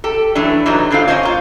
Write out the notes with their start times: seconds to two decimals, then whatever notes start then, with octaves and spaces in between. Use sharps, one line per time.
0.04 G4 A4
0.35 E3 F#3 A3 D4
0.66 E3 F#3 G3 D#4
0.91 A2 D3 C4 F4 F5
1.08 C#4 C5 C#5 D#5 G5 G#5
1.23 A#2 F4